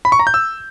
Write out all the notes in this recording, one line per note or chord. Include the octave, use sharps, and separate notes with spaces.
B5
C#6
A#5
G6
E6